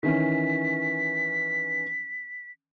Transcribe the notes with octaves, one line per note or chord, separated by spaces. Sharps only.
D#3 E3 C#4 B6